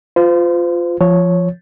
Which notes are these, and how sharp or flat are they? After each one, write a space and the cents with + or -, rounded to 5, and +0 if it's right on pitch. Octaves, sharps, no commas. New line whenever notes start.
F4 +0 C5 -35
F3 -15 C#5 +0